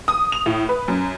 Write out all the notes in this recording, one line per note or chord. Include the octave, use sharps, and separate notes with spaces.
D#6
F7
A2
B4
F#2